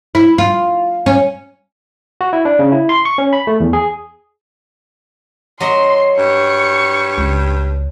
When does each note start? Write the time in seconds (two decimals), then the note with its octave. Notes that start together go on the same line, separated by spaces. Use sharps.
0.15 E4
0.38 F4
1.06 C#4
2.21 F#4
2.33 E4
2.45 D4
2.59 C#3
2.72 E4
2.89 C6
3.05 C#6
3.18 C#4
3.33 B5
3.47 A3
3.60 E2
3.73 G#4
5.60 F#3 D#5 C6
6.18 G2 C#6
7.18 C#2